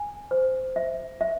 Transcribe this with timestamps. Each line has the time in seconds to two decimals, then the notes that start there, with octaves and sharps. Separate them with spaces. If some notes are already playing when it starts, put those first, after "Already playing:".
Already playing: G#5
0.31 C5
0.76 E5
1.21 E5